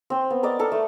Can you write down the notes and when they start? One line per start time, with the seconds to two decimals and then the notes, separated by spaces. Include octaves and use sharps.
0.10 C4 C5
0.30 B3
0.43 A#4 D5 D#5
0.59 A4 A#4
0.72 A3